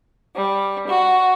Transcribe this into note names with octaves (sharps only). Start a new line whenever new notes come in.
G3
F#4